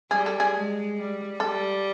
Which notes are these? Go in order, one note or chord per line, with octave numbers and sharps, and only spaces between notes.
G3 G#4
A4
G#4
G#3
G3
G3 A4